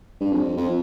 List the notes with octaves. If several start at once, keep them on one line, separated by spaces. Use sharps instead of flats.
G2
F2
F2